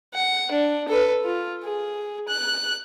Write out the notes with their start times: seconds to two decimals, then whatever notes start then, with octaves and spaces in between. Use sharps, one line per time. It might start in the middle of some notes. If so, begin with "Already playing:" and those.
0.14 F#5
0.51 D4
0.88 A4 B4
1.24 F4
1.63 G#4
2.28 F#6